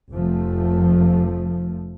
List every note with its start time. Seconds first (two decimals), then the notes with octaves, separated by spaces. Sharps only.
0.10 F1 F3 A3